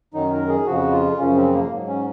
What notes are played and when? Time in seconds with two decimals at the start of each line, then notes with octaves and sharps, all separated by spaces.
0.14 F#2 D#3 F#3 D#4
0.32 A#4
0.49 G#4
0.66 F2 C#3 F3 F#4
0.92 F4
1.18 F#2 C#3 F3 C#4
1.36 C4
1.53 A#3
1.71 G#2 F#3
1.88 C#4